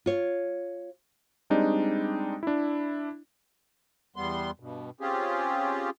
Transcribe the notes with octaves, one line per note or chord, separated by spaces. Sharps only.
F4 C#5
G3 G#3 C4 D4 D#4
D4 E4
E2 G3 B3 C6
G2 B2
C4 C#4 F4 G4 G#4